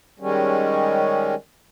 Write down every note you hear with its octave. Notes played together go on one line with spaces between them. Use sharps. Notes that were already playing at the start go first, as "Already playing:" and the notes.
D#3 G3 G#3 C#4